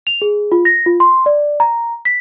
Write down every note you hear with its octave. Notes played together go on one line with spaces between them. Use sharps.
F7
G#4
F4
A#6
F4
C6
D5
A#5
B6